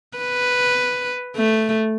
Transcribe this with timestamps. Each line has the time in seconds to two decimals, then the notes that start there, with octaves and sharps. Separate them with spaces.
0.17 B4
1.36 A3